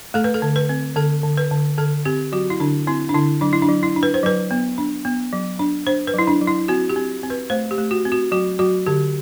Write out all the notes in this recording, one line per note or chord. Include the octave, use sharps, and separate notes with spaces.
A3 A4
B4
A4
D3
B4
C4
D3 A4
D3
B4
D3
D3 A4
C4 G4
F#3 F#4
E4
D3 D4
C4 E4
D4
D3 E4
F#3 D4
E4
D4
F#3
E4
D4
B4
C5
F#3 B4
B3
D4
B3
F#3
D4
D4 C5
B4
F#3 E4
D4
F#3
E4
C4 F#4
G4
C4
C4
B4
A3 C5
G4
A3
F#4
C4
F#4
F#3 F#4
F#3 F#4
D3 G4